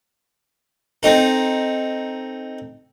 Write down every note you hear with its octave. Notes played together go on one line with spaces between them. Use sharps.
C4 D#4 A4